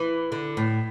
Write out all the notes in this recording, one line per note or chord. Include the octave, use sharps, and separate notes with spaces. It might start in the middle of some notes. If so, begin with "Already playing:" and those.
Already playing: E3
D3
A2